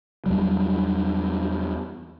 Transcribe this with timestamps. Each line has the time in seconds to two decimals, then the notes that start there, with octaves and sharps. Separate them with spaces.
0.26 E2 F#3 G3